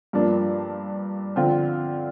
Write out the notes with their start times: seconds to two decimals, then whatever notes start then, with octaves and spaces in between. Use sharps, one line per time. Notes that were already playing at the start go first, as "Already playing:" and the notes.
0.13 G2 F3 A#3 D4
1.36 D3 F3 C4 F4